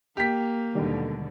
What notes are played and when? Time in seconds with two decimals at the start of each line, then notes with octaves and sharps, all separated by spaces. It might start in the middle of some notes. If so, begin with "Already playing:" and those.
0.17 A#3 G4 B6
0.75 D#2 B2 D3 D#3 G3 G#3